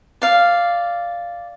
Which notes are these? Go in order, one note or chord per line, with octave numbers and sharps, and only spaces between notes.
D5 F5